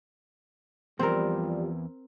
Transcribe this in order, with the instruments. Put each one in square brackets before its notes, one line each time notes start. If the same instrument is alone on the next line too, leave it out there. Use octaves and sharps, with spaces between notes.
[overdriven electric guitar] E2 [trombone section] F3 G3 [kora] C4 A#4